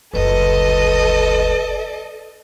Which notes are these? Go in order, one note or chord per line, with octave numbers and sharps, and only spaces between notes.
F#1 D2 A4 B4 D#5